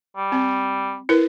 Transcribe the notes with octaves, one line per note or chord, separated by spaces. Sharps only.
G3
C4
E4 A#4 B4